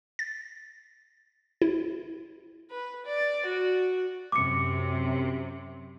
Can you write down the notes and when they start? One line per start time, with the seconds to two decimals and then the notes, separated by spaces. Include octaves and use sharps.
0.19 A6
1.62 E4
2.70 B4
3.06 D5
3.45 F#4
4.32 F#2 C3 D6 C#7